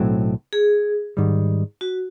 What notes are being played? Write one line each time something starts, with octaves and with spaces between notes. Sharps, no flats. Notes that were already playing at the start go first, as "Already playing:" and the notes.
Already playing: B1 A2 F#3 A3 C4
G#4
G#2 D#3 G3
F#4